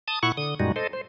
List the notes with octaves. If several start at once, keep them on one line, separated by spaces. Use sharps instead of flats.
A5 D#6
A#2 E4 F#5 C#6
D3 D#6
F#2 A#2 G3 G#3 D#4 F#4
A4 C5 D#5
C5